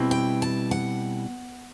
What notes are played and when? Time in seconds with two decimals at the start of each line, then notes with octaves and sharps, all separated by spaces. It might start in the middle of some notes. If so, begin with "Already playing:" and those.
Already playing: B2 G3 C4 E4
0.11 G5
0.42 A5
0.71 F#5